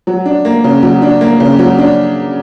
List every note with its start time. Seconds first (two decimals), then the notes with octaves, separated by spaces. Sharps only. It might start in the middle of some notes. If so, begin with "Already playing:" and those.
0.07 F#3
0.26 D4
0.45 A#3
0.64 C#3
0.83 F#3
1.02 D4
1.21 A#3
1.40 C#3
1.59 F#3
1.78 D4